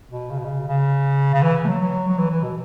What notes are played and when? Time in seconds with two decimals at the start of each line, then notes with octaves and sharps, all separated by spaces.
0.11 B2
0.31 C#3
0.39 B2
0.45 C#3
0.68 C#3
1.34 C#3
1.43 E3
1.65 A3
1.68 F#3
1.81 F#3
2.08 F#3
2.18 E3
2.31 E3
2.43 B2